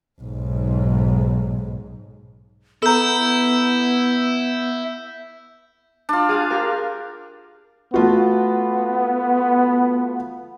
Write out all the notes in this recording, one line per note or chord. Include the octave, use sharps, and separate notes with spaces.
B1 G#2
B3 E4 A4 A#5 E6 G6
D4 F4
G#4 F5
G4 A#4
A3 B3 F4 F#4